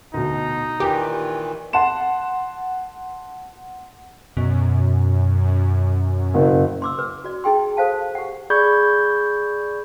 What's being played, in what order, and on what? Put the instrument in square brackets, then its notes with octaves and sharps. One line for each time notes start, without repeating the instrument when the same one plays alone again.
[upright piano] D2 B2 [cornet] D#4
[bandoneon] A#2 D#3 E3 [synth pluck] G4 [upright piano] G5
[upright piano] F#5 A5 C6 E7
[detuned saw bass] F#2 [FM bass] B2
[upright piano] F#1
[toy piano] C6 D6 E6
B4
F#4 D5
D#4 G#4 G5 C6
A4 C5 F5 A5
G4 F#5
[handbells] G#4 D5 B5 C#6 G6 G#6